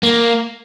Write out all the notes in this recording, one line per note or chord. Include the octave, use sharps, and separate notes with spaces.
A#3